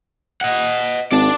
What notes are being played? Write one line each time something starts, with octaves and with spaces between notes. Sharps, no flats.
D#5 F#5
G#1 D5 A5